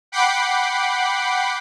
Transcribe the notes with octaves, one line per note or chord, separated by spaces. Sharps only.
F#5 G5 B5 D6 C7